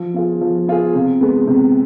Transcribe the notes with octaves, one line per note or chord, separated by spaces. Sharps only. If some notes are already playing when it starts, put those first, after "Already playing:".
Already playing: F3
B3 F4 G#4
F3
B3 F4 G#4
C3
G#3 B3
C3